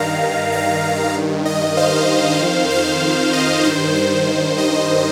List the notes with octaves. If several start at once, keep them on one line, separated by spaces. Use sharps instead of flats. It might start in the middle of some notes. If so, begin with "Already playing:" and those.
Already playing: G2 D#3 F5 A#5
F5 A#5
G2 D#3
D#5
C5 F5
F2 D#3
C5 F5
D#5
G2 D#3 C5
C5
D#5